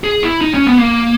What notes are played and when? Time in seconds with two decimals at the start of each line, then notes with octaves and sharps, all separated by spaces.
0.04 G#4
0.23 E4
0.41 D#4
0.54 C#4
0.67 B3
0.79 A#3